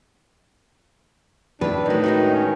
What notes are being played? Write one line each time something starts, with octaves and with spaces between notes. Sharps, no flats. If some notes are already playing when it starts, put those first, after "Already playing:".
D#3 E3 D4 B4
A2 D#3 F#3 D#4 F#4
G#3 D4 D#4 F#4
C#4